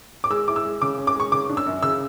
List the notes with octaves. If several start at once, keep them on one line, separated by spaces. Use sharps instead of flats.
D6
G#3 E6
E4 D6
E6
G#3
C#3 D6
C#4
D6
G#3 C#6
C#3 D6
D4
E6
F#2
C#3 E6